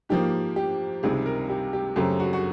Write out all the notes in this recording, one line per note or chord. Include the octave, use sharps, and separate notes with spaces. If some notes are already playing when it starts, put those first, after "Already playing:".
G#2 F3 A#3 G4
G4
C#2 C3 D#3 G3 G#4
A#4
G4
G4
F#2 C#3 F#3 A3 C4 G4
F#4
F#4